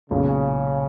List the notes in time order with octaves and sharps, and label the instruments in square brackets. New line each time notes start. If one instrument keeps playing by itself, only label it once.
[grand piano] B1 A#2 G#3 C#4 [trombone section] C#3